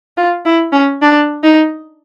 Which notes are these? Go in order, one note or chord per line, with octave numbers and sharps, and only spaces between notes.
F4
E4
C#4
D4
D#4